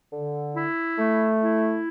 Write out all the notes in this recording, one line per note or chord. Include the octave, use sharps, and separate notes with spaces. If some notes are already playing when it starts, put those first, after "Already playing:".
D3
E4
A3
E4